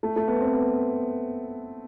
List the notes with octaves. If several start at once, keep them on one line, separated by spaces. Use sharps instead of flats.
A3
A3
B3
C4
B3